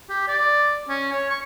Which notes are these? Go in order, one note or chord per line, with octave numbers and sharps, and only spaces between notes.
G4
D5
C#4
C#5
C#6